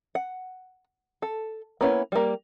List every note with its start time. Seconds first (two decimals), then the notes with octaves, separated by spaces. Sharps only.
0.15 F#5
1.22 A4
1.81 A#3 B3 C#4 E4 B4
2.12 G3 A#3